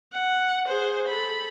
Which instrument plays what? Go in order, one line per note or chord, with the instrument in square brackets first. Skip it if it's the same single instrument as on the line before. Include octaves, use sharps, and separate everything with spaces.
[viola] F#5
G#4 C5
A4 B5